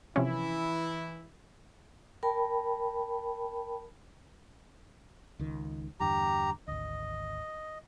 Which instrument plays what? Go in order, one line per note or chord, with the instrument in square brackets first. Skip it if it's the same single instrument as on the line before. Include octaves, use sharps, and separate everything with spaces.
[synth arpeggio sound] C3 F3 C#4 [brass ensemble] E3 E4
[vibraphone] A#4 G5 A5 B5
[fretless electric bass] C#2 D#3
[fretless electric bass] E2 G2 D3 [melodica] G4 A#5
[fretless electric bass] G#1 D2 [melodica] D#5